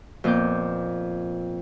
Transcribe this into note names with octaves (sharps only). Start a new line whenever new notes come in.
F2 A#2 B3 D6 G6